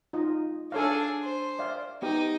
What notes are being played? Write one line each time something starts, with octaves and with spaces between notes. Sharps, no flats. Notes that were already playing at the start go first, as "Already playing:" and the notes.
D#4 F4 D#5
D4 G#4 A4 C#5 F5
C5
D5 E5 F5
B3 D#4 G4 G5